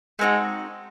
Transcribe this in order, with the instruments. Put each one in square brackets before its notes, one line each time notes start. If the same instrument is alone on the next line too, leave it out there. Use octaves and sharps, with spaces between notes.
[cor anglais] G#3 [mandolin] A3 C4 D#4 F#4